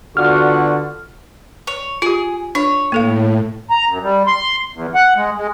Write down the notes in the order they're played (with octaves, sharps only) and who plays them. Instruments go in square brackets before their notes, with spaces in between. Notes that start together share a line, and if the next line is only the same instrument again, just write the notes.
[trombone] D3 [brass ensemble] B3 F4 F#4 [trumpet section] D5 F#5 C#6 [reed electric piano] F6
[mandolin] C#5
[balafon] F4 G4 [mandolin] G#4
[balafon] D4 [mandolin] C#5
[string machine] A2 [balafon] A#3 A4 F5
[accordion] A#5
F#2
G3
C6
E2
F#5
G#3
G#3